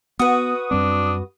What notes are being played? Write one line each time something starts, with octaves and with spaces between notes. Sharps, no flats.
B3 F#4 B4 D#6
F#2 G3 C4 D4